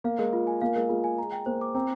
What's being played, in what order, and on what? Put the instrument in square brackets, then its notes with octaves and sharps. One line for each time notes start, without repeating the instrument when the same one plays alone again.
[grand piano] A#3 [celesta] F5
[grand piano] G#3 [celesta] A#4
[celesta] F4
G#5
[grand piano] A#3 [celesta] F5
[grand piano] G#3 [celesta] A#4
[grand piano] G#3 [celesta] F4
[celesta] G#5
A#5
G5
[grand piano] A#3 [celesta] C5
[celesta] D6
[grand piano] C4 [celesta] A#5